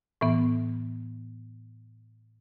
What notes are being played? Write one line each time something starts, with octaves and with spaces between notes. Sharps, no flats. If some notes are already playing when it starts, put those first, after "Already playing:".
A2 E3 B3